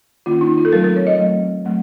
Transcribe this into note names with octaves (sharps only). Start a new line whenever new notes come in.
D#3 A#3 C#4 F4
D#4
F4
A4
F#3 A3 C4 A#4
A#4
C#5
D#5
F#3 A3 C4
F#3 A3 C4